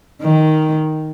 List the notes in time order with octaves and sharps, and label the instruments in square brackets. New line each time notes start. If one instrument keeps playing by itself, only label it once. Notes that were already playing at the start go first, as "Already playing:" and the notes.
[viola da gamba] D#3